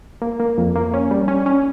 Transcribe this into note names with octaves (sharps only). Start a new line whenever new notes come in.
A#3
A#3
F2
A#3
C#4
G3
C#4
C#4